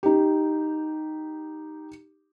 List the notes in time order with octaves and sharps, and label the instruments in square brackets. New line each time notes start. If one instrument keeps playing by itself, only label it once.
[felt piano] D#4 G4